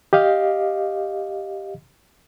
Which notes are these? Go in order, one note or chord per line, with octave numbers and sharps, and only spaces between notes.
G4 D#5 F5